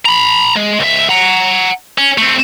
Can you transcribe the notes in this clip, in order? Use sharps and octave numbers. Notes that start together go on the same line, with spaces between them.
A#5 B5
G#3
C#2 E5
F#5 A#5
C#4
A3 C4